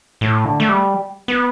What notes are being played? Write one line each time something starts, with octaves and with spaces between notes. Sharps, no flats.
A2
D3
A3
G3
B3